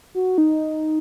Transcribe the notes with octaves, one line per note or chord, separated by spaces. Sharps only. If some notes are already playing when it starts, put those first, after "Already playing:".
F#4
D#4